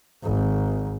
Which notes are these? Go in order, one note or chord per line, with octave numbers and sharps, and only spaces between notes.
G#1